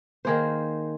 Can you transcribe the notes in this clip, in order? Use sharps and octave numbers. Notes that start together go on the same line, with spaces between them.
D#3 A#3 G#4 C5